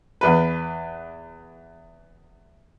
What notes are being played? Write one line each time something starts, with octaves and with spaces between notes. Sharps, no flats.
E2 B4